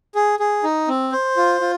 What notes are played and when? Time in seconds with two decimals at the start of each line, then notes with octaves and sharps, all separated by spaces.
0.15 G#4
0.39 G#4
0.64 D#4
0.88 C4
1.12 C5
1.37 F4
1.61 F4